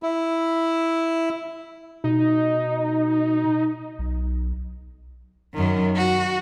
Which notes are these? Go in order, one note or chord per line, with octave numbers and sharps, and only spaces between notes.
E4
B2 D#4
B1
F#2 D#3
F#4